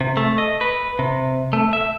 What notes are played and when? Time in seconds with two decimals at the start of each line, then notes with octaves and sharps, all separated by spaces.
0.01 C3
0.17 A3
0.38 D#5
0.61 B4
0.99 C3
1.53 A3
1.73 E5